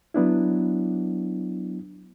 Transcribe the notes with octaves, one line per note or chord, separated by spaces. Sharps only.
F#3 B3 D4 E4